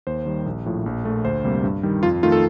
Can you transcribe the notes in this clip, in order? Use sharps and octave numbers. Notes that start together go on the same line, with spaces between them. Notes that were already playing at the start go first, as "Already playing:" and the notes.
D#2 C5
D#3 G3
A#1
A2 F3
A#1
A#2 A3
D2 C5
C3 G3 A#3
G2
D#3 G3
F2 F4
D#3 A3 F4
A4